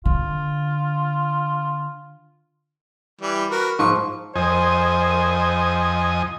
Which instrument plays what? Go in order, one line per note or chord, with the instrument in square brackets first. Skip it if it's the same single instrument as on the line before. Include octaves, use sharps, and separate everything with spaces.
[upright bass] D3 [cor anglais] F4
[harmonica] E3 G3
F#4 A#4 B4
[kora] G#2 F3 A#3 [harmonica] C#6
[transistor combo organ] F2 D#5 G#5 [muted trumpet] C5